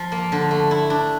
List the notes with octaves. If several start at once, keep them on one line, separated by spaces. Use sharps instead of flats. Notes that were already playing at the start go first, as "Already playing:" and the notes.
Already playing: F3
A#3
D3
A3
E4
D4